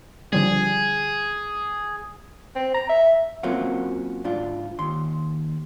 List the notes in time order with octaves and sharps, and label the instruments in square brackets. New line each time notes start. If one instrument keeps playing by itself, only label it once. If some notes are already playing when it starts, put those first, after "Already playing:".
[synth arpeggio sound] D3 F3 G3 [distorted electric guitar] G#4
[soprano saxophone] C4
A#5
E5
[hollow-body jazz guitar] F#3 A#3 C4 C#4 F4 F#4
G#2 D4 F4
D#2 C6